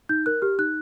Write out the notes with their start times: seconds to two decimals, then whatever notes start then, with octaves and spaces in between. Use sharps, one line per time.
0.09 D#4 G6
0.26 A#4 F#6
0.42 G4 F6
0.59 D#4 F#6